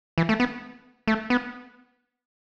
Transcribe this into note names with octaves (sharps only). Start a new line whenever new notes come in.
E3
A3
B3
A3
B3